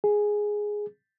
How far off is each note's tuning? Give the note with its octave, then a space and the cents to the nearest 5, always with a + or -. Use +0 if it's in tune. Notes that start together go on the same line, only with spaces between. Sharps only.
G#4 +0